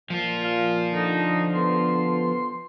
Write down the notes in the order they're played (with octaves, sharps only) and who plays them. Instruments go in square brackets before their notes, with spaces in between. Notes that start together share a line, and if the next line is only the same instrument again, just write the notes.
[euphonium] A#2 [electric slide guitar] F3 F4
[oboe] F5
[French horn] D3 [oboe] D#4
[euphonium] B3 [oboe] C6